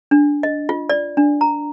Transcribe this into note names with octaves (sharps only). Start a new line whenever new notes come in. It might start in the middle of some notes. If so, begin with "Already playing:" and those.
D4
D#5
F4
D5
D4
A#5